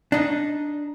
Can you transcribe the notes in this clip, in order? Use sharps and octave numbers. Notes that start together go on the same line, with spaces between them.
D4 D#4